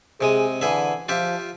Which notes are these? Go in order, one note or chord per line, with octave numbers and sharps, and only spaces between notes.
C3 G#3 G#4 D#6
D3 E3 G#4 E5
F3 F4 G4 E5